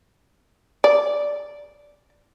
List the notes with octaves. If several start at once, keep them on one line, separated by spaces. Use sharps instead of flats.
D5